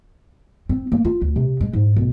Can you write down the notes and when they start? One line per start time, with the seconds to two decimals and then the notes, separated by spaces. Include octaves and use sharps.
0.69 C4
0.92 A#3
1.05 F4
1.21 D2
1.36 C3
1.61 G#3
1.73 G#2
1.96 B1